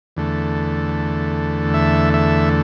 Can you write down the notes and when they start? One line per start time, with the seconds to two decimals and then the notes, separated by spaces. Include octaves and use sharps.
0.17 E2 D3 A3
1.74 E5
2.14 E5